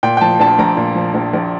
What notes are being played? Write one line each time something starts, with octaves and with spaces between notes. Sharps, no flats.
A#2 G5
G5
F3 A5
A#1 A5
A#1 A#5
A#2
F3
A#1
A#1